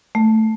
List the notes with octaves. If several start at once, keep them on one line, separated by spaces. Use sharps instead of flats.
A3